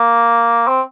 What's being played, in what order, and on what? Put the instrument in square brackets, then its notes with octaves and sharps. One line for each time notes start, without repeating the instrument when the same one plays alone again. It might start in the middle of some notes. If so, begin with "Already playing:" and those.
Already playing: [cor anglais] A#3
C4